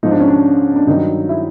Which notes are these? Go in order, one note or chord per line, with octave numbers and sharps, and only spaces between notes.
G#2 F3 D#4
D4
C#4
D4
D4
G2 D#3 F#3 D#4
E4